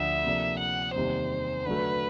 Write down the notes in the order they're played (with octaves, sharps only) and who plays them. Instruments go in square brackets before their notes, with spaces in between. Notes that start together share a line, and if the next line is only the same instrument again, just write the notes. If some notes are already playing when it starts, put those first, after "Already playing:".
Already playing: [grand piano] D2 D3 F3 [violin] E5
[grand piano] C3 F3 A#3 D4
[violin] F#5
[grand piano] E2 C3 D#3 G3 A#3 [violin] C5
[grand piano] D3 F#3 A3 [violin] B4